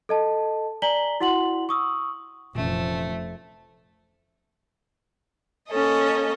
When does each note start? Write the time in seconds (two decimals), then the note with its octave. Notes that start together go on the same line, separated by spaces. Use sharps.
0.09 A4 D#5 A5
0.82 D5 G#5 A#5 B6 F#7 G7
1.20 E4 F#4 F#5 C6 F#7
1.69 C#6 D#6 E6
2.55 F1 A#2 E3 F3 A3 C#4
5.71 A#3 C#4 A4 D#5